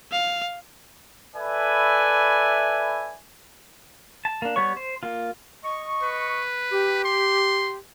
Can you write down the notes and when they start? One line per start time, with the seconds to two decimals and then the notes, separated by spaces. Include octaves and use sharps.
0.12 F5
1.35 E4 A4 B4 D5 E5 G#5
4.25 A5
4.42 A#3 D4
4.56 G3 B3 C#5 C#6
4.77 C5
5.03 A#3 F4
5.64 D#5 C#6
6.03 B4
6.72 G4
7.04 C6